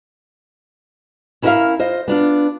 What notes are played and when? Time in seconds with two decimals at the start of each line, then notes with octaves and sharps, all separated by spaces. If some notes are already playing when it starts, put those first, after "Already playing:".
1.42 C#4 E4 A#4 D5 E5 F5
1.79 F4 C5 D#5
2.08 B3 D4 F4